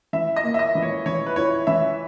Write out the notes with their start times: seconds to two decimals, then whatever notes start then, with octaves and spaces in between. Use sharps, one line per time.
0.13 E3 E5
0.36 D#5
0.44 A#3
0.54 E5
0.59 D#5
0.75 E3
0.83 C#5
1.06 E3 C#5
1.26 B4
1.36 E4 C#5
1.67 E3 E5